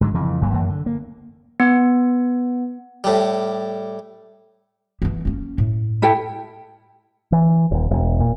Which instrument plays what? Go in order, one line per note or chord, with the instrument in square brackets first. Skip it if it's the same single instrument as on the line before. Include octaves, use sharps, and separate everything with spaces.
[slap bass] G#2 D3 F#3
F2 C#3 E3
G1 G2 F#3 A#3
F#2 E3 A#3
D3
A#3
[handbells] B3
[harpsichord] A2 G3
[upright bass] E3 B3
A#3 C#4
A2
[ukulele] E4 A4 G5
[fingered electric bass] E3
D#1
E1
A#2